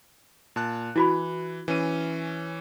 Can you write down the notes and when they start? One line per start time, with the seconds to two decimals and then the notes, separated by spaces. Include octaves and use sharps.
0.56 A#2 A5 F#6
0.96 E3 E4 F#4 B5
1.68 E3 C#4 D#7